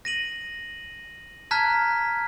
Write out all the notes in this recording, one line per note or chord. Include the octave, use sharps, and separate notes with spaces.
A#6 D#7 F#7
A5 A#5 F6 F#6 G#6 B6